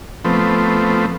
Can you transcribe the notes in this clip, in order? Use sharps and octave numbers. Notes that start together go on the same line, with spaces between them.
F3 A3 B3 C4